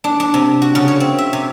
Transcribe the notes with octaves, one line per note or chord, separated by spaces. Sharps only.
D4
D4
C3
F#4
C#3
C#5
C4
E5
C3